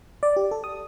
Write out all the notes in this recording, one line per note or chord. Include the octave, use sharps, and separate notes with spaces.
D5
G4
A4
D#6